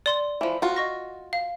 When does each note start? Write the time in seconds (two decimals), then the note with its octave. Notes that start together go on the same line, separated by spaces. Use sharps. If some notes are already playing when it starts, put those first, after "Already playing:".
0.06 D5 C6
0.41 E3 F3
0.62 F4 F#4
0.76 D#5 C#6 A#6
1.33 F5